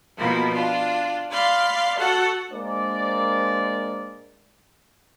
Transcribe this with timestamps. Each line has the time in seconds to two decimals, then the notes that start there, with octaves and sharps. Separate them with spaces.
0.17 B2 F3 A#3 E4
0.52 D4 F4
1.31 D5 F5 B5 C6
1.98 F#4 A4 F#5 A5
2.52 G#3 A#3 D4 A#4 C5 D5